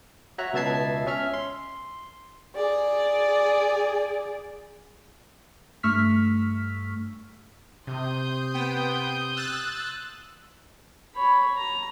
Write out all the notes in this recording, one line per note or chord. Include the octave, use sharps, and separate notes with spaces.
F#4 C#5 E5 A#5 F#6
C#2 B2 E5 A5 G#6 C7
C#4 E5 F6
C6
G#4 D5
G2 A3 C#6 E6 F6 B6
C3 C6 D#6 G6
B3 G5
E6 F#6 A6
C#5 B5
A#5